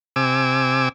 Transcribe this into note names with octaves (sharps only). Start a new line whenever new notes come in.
C3 G#5 D6 E6